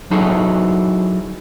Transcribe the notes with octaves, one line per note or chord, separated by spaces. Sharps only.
F#3 D#4 E4 F#4 G#4 A4